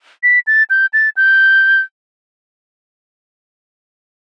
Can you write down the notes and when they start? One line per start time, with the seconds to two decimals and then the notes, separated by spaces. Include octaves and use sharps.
0.23 B6
0.47 A6
0.70 G6
0.93 A6
1.17 G6